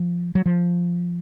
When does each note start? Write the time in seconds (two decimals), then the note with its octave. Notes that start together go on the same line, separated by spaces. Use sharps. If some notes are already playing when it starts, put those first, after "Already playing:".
Already playing: F3
0.35 F#3
0.46 F3